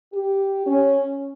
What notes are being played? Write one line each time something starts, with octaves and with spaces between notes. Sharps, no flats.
G4
C#4